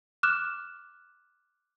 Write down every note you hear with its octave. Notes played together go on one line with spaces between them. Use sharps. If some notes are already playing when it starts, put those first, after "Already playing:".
D6 F6 F#6 E7